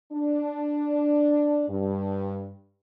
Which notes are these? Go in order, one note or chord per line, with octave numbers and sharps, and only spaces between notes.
D4
G2